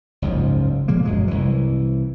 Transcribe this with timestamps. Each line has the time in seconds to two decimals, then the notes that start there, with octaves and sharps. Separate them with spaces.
0.22 F#1 C#2 G#2 F3
0.88 A#2 F3 G#3 A#3
1.05 F#1 F#2 F#3 G#3
1.28 C2 E3